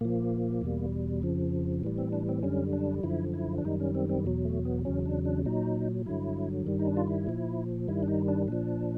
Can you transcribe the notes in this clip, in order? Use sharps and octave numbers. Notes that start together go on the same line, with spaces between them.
A#2 F3 A#3
E2 B2 G3
F2 C#3 F3
A2 E3 G3
C4
D4
C4
F#2 D3 G3 C#4
D4
F#2 D3 F3 E4
E4
D4
F#2 D#3 G3 D#4
C#4
C4
C4
E2 B2 F#3
A3
B3
E2 C#3 F#3 C#4
D4
D4
A#2 F#3 D#4
G2 D3 F#3 E4
G2 D#3 G3
D#4
D4
F4
E4
A#2 F3
G2 D#3 G3 E4
D4
D#4
D4
A#2 F3 D4